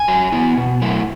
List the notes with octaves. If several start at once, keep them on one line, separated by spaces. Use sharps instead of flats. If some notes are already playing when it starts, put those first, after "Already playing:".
Already playing: G#5
F#3
B3 E4
B2
F#3 A3 E4